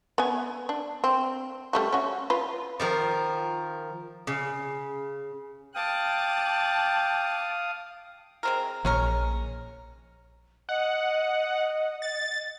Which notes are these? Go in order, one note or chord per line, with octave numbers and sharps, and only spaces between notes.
B3 G#5
D4
C4
G3 A3 F#4
C#4 F#4
F4 B4
D#3 F3 A#4
C#3
F5 G5 A5 D6 D#6 F#6
G#3 C4 A#4
A#1 G#3 C#4 A#4
D#5 F#5
A6